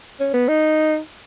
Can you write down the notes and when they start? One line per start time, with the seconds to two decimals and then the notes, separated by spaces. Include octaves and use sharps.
0.20 C#4
0.34 B3
0.48 D#4